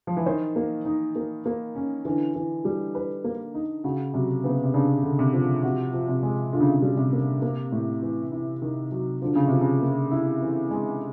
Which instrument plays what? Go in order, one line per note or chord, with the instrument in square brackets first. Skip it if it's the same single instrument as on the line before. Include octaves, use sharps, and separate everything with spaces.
[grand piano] F3
E3
[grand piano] D#3 [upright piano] C5
[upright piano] A#3
D#4
A#3
A#3
C#4
[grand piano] D3 [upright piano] E3
[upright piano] E3
G3
B4
A#3
D#4
[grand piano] C#3 [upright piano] F#4
[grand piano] C3 [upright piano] F#3
[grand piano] C#3 [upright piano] B3
[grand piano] C3
[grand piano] C#3 [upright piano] D4
[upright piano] D3
[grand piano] C3
[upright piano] F3
[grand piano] C3 [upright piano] F#4
[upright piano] F3
[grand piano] C3
[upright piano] G#3
[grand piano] D3 [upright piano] F4
[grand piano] C#3
C3
C#3
[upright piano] G3
[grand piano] C3
[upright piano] A#3
A#3
A2
E3
E4
D#3
F#3
[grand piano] D3 [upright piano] F3
[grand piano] C#3
[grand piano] C3 [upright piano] F3
[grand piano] C#3
[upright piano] A#3
E4
E3
G#3